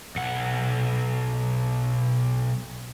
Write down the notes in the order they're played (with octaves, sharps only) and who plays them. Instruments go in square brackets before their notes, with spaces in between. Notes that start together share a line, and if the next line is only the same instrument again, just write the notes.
[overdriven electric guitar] B1 F#5